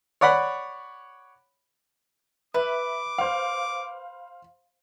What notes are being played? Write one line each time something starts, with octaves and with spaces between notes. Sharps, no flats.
C#5 D5 F#5 B5
B4 E5 D6
C5 F5